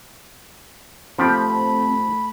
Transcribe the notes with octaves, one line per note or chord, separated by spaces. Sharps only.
F3 A3 C4 G4 B5